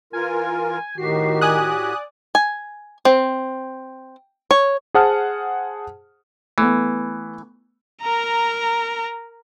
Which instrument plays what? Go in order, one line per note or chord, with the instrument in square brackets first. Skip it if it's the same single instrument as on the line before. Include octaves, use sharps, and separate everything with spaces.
[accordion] E3 F4 A#4 [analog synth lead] G#5
[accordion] A2 F#4 G4 [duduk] D#3 [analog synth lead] C7
[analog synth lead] D5 [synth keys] G#5 D#6 F#6
[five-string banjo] G#5
C4
C#5
[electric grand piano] G#4 C5 F#5 A5 D#6 F6
[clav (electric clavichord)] E3 [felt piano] A3 B3
[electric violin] A#4 A#5